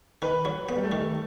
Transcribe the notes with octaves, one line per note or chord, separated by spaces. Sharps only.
D#3 B4
F#3
B3
G3
A3
D#3